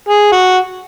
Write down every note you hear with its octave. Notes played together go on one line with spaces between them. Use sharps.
G#4
F#4